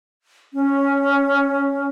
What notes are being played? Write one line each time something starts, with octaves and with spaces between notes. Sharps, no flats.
C#4